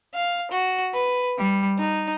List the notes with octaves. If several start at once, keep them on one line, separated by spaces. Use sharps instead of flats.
F5
F#4
B4
G3
D#4